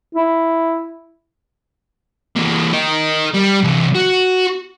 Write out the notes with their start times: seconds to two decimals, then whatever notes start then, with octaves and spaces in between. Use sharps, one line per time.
0.15 E4
2.36 E3 A#3
2.73 A#4 D#5
3.34 G3
3.64 C3 E3
3.95 F#4